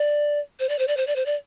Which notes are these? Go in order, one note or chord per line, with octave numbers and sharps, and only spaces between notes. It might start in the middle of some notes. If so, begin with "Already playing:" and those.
Already playing: D5
C5
D5
C5
D5
C5
D5
C5
D5